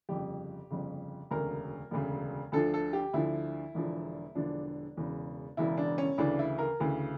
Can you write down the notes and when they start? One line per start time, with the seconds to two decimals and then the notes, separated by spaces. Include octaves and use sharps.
0.09 G1 F2 C#3 G4
0.70 G1 F2 C#3
1.31 E1 D2 C#3 A#4
1.91 E1 D2 C#3
2.52 D2 D3 F3 A4
2.74 A4
2.93 G4
3.13 D2 D3 F3 E4
3.75 E1 E2 D3 F3
4.35 E1 E2 D3 F3 D4
4.97 E1 E2 C#3
5.57 E1 E2 C#3 E4
5.77 D4
5.98 C#4
6.18 D2 C#3 E3 D4
6.39 E4
6.58 A#4
6.80 D2 C#3 E3